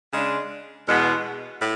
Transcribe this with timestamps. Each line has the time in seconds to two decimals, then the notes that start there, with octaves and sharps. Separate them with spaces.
0.12 C#3 G#3 D4
0.86 E2 B2 G#3 B3
1.60 A2